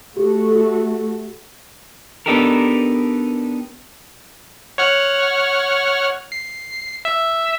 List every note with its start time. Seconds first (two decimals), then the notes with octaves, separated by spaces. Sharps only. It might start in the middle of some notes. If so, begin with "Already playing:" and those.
0.17 A3 F#4 G4 A4
2.26 B3 D4 D#4 G4 A4 A#4
4.78 C#5 F#5 F6
6.32 C7
7.05 E5